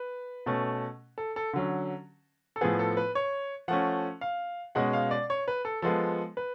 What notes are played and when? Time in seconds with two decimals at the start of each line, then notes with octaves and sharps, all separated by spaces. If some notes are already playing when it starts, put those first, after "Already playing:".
Already playing: B4
0.46 B2 A3 C#4
1.18 A4
1.36 A4
1.53 D3 F#3 C#4
2.56 A4
2.61 A2 F3 B3 G#4
2.79 A4
2.97 B4
3.15 C#5
3.68 F3 A3 C#4 F#5
4.21 F5
4.75 B2 G#3 C#4 F#5
4.93 F5
5.11 D5
5.30 C#5
5.48 B4
5.65 A4
5.82 F3 G#3 B3 A4
6.37 B4